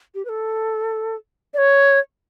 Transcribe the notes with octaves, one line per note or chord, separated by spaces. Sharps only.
G4
B4
A4
D5
C#5